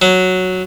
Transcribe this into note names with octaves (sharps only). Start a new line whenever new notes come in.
F#3